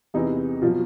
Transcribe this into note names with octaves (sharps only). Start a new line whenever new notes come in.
E2 C3 E3 D#4
B2 F3 F#3 F4